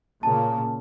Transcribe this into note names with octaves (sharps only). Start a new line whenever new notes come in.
A#2 C#3 A#3 A5